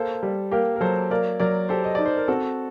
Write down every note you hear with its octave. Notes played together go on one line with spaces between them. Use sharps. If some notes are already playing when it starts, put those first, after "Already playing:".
Already playing: A#3 A4 C5
G3
A#3 G4 A#4
A#4
F#3 A4 C5
A#3 A#4 D5
F#3 A#4 D5
G4 A4 C5
D#5
D#4 D5
C5
A#4
C4 F#4 A4